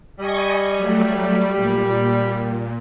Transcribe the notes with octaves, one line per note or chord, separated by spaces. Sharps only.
G3 D#5 G#5 C#6
F#3 A3
A#2